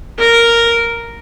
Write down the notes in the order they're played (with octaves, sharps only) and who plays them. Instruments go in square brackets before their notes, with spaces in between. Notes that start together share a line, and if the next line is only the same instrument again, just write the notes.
[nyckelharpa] A#4